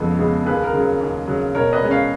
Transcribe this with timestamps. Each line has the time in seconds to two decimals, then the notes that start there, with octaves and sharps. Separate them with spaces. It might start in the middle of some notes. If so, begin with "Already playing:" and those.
Already playing: F2 C#3 G#3 B3
0.19 C#3 G#3 B3
0.46 D#2 G#4 B4
0.64 A#4
0.73 C#3 F#3
1.01 D#2
1.28 C#3 F#3
1.55 B2 A#4 C#5
1.73 B4 D#5
1.82 G#3 C#4
1.91 C#5 F5